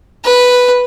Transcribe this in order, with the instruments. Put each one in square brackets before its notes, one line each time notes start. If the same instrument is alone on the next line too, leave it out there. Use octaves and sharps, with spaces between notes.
[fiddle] B4